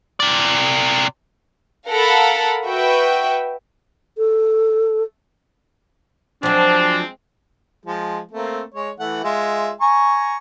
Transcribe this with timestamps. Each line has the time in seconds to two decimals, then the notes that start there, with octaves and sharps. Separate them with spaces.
0.20 C3 D5
1.88 A4 A#4 F5 F#5 A5 B5
2.64 F#4 B4 E5 G5
4.18 A4
6.43 F3 F#3 G#3 C4 D4
7.85 F3 G#3
8.31 A3 A#3 C4
8.74 G#3 C#5
9.00 E3 A3 F#5
9.24 G#3 F4 E5
9.81 G#5 A#5 C#6